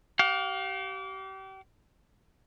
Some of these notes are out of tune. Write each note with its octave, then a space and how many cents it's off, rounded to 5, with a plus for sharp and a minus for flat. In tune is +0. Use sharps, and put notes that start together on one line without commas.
G4 -35 F5 +25